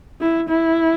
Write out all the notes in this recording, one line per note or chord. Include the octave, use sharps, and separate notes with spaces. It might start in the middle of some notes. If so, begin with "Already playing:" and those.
E4
E4